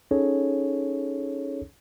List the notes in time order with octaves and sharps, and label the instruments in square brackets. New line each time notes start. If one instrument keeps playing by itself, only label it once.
[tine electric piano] C#4 D#4 G#4 A4 C#5